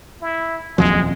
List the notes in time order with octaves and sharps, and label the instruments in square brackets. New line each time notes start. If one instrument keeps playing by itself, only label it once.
[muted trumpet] E4
[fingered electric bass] D#1 F2 [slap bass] A#1 F3 F#3 [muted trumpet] G#3